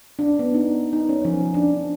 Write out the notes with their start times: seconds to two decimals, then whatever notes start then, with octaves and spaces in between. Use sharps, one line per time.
0.19 D4
0.39 B3
0.54 D#4
0.93 D#4
1.09 C#4
1.25 F3
1.54 D4